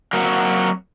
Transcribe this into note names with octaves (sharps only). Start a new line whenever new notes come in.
F#3 A#3 C4 F#4